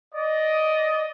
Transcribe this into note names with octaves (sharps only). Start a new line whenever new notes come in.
D5 D#5